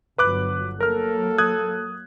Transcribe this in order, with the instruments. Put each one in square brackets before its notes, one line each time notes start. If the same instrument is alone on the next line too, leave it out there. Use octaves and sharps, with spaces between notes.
[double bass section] G1 F#3 [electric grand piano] B4 D6 F#6
[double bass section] F#3 A#3 [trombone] A4 [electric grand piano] A#4 F6
[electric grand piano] D#6 F#6 G#6